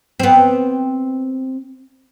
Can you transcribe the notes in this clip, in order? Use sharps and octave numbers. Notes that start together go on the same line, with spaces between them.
B3 C4